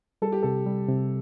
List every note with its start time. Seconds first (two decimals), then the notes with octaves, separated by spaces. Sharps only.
0.22 G3 A4
0.32 G4
0.43 C3 A4
0.66 G3
0.89 C3